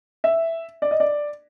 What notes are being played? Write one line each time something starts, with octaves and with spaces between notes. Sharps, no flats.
E5
D5
D#5
D5